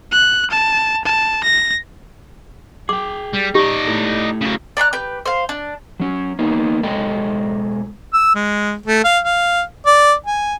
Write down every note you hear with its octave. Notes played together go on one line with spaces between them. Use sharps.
F#6
A5
A5
A#6
G#4 G5 D6
G3
D#4 G4 D5
A3 E4 A4
C#3 F#3
D5 A#5 C6 F#6
G4 B4 G6
C5 F5
D4
F#3 C#4
A#3 B3 D#4
B1 G#3 A4 D#5 G5
E6
G#3
A3
F5
F5
D5
G#5